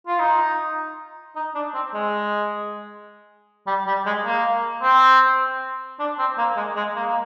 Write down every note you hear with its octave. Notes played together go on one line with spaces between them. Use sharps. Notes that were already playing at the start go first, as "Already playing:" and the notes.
F4
D#4
D#4
D4
C4
G#3
G3
G3
G#3
A#3
C4
D4
C4
A#3
G#3
G#3
A#3
A#3